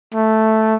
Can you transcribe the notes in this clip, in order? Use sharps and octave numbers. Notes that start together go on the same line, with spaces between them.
A3